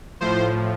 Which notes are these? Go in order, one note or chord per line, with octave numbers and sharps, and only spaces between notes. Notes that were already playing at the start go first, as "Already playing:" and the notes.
A2 F3 C5